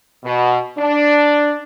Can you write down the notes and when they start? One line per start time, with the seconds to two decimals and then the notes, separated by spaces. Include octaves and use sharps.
0.23 B2
0.77 D4